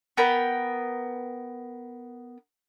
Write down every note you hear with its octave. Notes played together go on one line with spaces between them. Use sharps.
B3 A#4 G5 B5